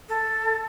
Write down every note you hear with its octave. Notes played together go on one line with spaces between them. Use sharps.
A4